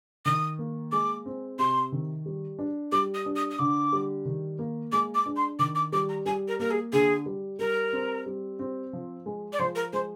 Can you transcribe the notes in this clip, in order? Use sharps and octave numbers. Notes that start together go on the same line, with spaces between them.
D#3 D#6
A#3
G#3 D6
C4
C3 C6
D#3
G3
D4
G3 D6
D#6
D4
D#6
D#6
D3 D6
G3
D#3
A#3
G#3 D6
D6
D4
C6
D#3 D6
D6
G3 D6
A#5
G3 G#5
A#4
A#3 A#4
G#4
D3 G#4
G3
G3 A#4
C4
G3
C4
F3
G#3
D5
F3 C5
A#4
G#3 C5